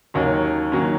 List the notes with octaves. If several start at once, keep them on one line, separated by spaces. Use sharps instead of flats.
D#2 D#3 F#3 A#3 C#4
D#3 F#3 A#3 C#4